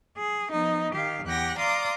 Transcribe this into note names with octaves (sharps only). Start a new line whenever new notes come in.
G#4
F3 B3 D#4
D#3 G4 F5
E2 G4 F#5 G5 A#6
D5 F5 A#5 C6 D6 D#6